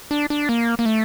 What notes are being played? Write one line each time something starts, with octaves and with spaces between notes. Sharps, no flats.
D4
D4
A#3
A#3
A3